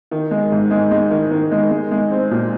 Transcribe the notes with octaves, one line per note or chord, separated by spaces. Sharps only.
D#3
G#3
G#2
G#3
G#3
D#3
D#3
G#3
G#3
G#3
C4
A#2